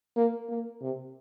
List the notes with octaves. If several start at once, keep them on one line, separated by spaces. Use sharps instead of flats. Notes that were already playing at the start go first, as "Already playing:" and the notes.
A#3
A#3
C3